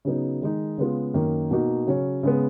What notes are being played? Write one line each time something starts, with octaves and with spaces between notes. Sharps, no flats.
C#3 F#3 B3 D#4
D#3 G#3 D#4
C#3 G#3 B3 F4
F#2 D#3 A#3
B2 A#3 D#4 F#4
C#3 F#3 C#4
C#3 G#3 B3